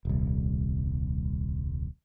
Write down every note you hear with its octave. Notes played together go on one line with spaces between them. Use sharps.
D#1 C2